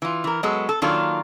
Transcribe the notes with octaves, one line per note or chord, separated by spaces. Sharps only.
E3 F4
E3 A#4
F#3 G#3 B3 A4
A4
D#3 F#3 A#3 D4 F4 A4